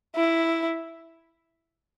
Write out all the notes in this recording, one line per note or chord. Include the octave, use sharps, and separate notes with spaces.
E4